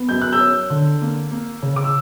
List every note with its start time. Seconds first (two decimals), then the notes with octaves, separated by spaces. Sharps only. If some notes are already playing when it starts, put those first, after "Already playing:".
Already playing: B3
0.09 F#2 G6
0.22 F#6
0.33 E6 G6
0.40 C#4
0.70 D3
1.02 A#3
1.31 A#3
1.62 C#3
1.76 D6
1.84 E6